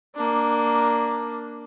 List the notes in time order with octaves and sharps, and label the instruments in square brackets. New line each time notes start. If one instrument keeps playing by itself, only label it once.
[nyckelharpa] A#3 D4